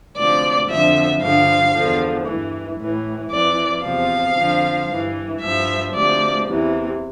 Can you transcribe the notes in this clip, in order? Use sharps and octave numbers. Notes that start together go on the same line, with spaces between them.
D2 C3 F3 D5
F2 D3 F3 E5
G2 D3 F3 F5
E2 D3 F3
G2 E3
A2 E3
F2 E3 D5
E2 C3 F3 F5
F2 D3 F3
G2 E3
G2 F3 E5
D2 C3 F3 D5
E2 C3 E3